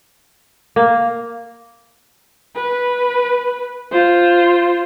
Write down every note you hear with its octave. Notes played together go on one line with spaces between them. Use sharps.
A#3
B4
F4 C5